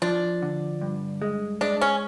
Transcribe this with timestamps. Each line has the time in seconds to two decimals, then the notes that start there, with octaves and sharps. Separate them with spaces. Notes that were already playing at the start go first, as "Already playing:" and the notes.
0.02 F3 D4
0.42 D3
0.81 G2
1.22 G#3
1.61 G#3 D4
1.81 C#4